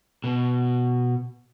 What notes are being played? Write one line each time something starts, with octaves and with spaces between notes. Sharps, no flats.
B2